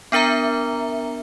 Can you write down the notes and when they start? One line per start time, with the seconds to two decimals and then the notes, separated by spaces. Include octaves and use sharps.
0.12 B3 D4 A#4 E5 A#5